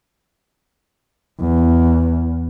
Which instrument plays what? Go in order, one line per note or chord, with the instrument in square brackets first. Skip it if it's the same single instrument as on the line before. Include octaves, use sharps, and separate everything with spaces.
[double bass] E2